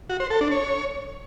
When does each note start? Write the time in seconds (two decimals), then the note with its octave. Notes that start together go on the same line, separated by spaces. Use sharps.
0.10 F#4
0.20 C5
0.30 A4
0.41 D4
0.51 C#5